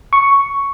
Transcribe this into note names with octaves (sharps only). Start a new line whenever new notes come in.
C#6